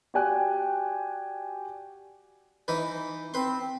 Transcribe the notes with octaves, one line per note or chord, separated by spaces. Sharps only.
F#4 G4 D5 G5 G#5 F#6
E3 D#4 B4
C4 B4 C6